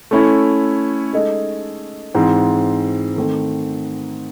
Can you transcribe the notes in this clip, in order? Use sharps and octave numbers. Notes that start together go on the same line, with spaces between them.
A3 C#4 E4
G#3 D#4 A4 D#5
G#2 E3 C4
D#3 A3 C4